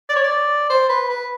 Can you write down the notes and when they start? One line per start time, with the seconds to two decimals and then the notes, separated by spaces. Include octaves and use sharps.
0.09 D5
0.16 C#5
0.24 D5
0.69 C5
0.89 B4
1.09 B4